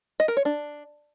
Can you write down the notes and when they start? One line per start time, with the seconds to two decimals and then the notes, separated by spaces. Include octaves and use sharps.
0.20 D#5
0.28 A#4
0.37 C#5
0.45 D4